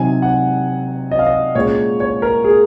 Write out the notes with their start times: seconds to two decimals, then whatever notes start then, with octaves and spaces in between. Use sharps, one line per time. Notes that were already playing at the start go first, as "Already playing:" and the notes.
Already playing: C3 F#3 C4 D#4 G#5
0.22 F#5
1.11 D#5
1.19 F5
1.26 D#5
1.55 A#2 G#3 C#4 C#5
2.00 C#5
2.22 A#4
2.44 G#4